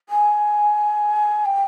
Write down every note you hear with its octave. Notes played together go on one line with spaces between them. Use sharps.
G#5
G5